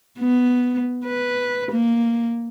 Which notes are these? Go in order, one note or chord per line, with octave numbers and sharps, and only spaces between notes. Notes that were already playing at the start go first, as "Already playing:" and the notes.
B3
B4
A#3